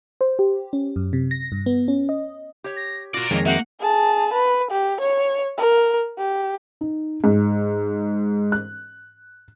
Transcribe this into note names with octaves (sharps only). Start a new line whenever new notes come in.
C5
G4
C#4
F#2
C3
A#6
G2
B3
C#4
D#5
G4 C#5
A#6
F4 F#4 A#4 D5 A#6
F2 D#3 G#3 A#3 C#5 A#6
A#3 C4 F#4 E5 F#5
G#4 A5
B4
G4
C#5
A#4
G4
D#4
G#2
F#6